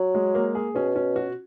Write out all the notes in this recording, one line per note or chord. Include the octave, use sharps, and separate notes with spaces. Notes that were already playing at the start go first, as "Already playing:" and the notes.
Already playing: F#3
G#3
A#3
G#4
B2 C#4
C#4
F#4